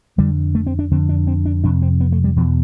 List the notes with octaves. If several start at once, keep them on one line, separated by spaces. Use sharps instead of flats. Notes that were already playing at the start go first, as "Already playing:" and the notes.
F2 D3 G3
A3
C4
D4
F2 D3 C4
D4
C4
D4
F2 C3 D4
C4
B3
A3
G3
E2 B2 F3